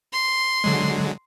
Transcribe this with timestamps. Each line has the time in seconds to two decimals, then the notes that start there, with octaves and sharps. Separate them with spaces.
0.13 C6
0.64 D3 F#3 G#3